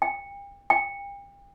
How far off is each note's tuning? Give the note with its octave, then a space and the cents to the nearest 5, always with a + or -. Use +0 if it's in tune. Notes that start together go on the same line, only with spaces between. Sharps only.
G5 +35
G5 +35